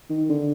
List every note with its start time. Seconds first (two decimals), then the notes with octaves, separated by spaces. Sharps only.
0.10 D#3
0.29 D3